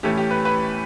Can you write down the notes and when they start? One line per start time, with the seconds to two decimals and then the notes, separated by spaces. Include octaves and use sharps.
0.03 A2 E3 A3 C#4 G4
0.17 G4
0.31 B4
0.45 B4